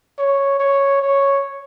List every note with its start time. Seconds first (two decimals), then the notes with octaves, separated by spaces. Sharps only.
0.19 C#5
0.60 C#5
1.02 C#5